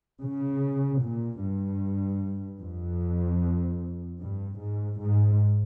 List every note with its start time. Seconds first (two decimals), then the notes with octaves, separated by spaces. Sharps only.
0.22 C#3
1.02 A#2
1.42 G2
2.61 F2
4.21 G2
4.61 G#2
5.01 G#2